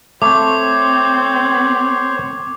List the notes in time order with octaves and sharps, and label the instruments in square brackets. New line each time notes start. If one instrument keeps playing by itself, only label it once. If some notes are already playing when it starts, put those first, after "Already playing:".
[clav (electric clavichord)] A3 [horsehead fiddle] C4 [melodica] C5 C#5 [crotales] D6